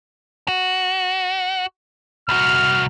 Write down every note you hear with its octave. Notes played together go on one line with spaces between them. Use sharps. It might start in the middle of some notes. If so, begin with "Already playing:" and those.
F#4
C2 F#4 F6